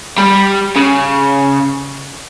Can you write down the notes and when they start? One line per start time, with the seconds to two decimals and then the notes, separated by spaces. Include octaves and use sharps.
0.18 G3
0.76 C#3